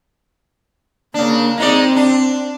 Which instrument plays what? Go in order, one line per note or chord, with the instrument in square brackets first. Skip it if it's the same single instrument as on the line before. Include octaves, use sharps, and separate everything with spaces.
[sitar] C#3 D4 [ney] A#3
[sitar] G#3 D#4 D5 [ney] C4
[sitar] D4